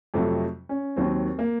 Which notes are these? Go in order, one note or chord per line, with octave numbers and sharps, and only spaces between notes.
F2 C3 F#3 A3
C#4
D#2 D#3 F#3 C4
A#3